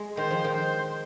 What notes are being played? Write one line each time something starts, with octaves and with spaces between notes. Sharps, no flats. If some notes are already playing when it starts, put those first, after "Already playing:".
Already playing: G#3
D#3 C5
F3
D#3
C5